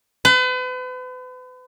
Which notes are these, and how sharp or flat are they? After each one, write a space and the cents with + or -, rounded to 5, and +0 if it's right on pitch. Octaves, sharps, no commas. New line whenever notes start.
B4 +40